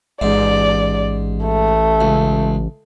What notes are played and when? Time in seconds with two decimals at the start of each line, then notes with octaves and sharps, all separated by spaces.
0.21 A1 G#2 D5
1.45 A3
2.01 C#2